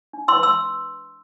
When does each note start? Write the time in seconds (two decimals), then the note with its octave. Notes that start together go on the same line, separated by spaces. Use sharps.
0.13 D4
0.28 B4 C6 E6
0.43 C6 E6